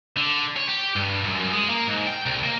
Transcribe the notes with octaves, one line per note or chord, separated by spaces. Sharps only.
D3
C#5
G4
G2
F#2
F#2
G#3
A#3
G#2
G5
C2
A#3